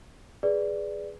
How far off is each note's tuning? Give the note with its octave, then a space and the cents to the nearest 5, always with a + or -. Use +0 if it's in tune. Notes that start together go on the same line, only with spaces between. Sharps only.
G#4 +0 B4 +0 D5 +0